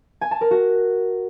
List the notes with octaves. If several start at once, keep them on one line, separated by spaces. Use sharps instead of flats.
G#5
A5
A#4
F#4